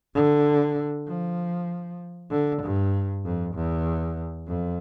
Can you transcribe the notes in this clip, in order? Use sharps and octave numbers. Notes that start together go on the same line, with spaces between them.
D3
F3
D3
G2
F2
E2
F2